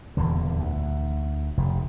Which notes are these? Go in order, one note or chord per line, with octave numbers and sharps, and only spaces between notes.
D#1 E2 D3
D2
F1